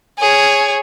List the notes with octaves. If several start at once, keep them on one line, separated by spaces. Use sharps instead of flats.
G#4 C#5